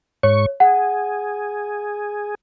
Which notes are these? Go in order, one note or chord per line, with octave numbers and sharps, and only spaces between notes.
G#2 C#5 C#6
G#4 F#5